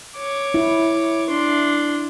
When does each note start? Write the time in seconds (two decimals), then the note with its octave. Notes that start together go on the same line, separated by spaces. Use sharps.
0.18 C#5 D6
0.54 E4
1.29 D4 C6